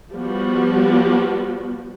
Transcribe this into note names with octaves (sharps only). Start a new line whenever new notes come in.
F3 G3 B3 F#4